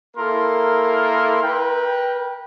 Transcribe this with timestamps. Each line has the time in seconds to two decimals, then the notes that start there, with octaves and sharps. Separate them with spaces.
0.17 A#3 E4 A4 A#4 C6
1.43 A#4 B4 G5